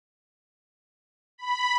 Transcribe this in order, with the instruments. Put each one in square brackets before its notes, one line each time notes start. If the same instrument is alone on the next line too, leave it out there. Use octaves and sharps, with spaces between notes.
[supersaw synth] B5